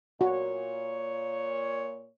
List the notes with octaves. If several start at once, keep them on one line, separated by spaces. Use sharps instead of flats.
A#2 F#4 C#5